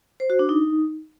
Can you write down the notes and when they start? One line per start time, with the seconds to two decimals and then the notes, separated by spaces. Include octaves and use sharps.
0.20 C5
0.30 F#4
0.39 D4
0.49 D#4